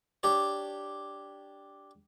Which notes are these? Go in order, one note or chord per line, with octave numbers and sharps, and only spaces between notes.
D4 G4 C#5